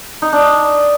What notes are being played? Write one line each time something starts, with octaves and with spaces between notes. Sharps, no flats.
D#4
D4